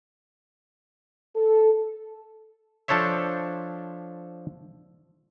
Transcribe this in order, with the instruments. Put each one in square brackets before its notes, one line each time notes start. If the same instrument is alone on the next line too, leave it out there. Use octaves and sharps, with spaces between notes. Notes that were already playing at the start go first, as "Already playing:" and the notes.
[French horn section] A4
[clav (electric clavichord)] F3 D4 A4 C5 C#5 E5